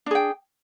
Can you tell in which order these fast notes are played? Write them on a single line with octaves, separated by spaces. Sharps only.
D4 G#4 G5